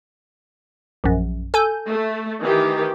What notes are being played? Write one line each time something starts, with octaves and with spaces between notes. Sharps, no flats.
A#1 F#2
A4 G#5 G6
A3
D#3 E3 G4